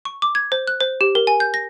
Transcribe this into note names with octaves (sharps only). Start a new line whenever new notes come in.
C#6
D6
G#6
C5
F#6
C5
G4
A#4
G#5
G6
A#6